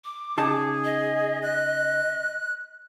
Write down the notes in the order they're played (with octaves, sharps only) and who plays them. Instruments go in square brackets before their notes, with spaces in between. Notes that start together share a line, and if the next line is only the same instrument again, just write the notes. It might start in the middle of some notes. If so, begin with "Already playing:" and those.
[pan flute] D6
[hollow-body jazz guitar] C#3 D#4 A5 [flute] G#4
[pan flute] D#5
[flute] F#6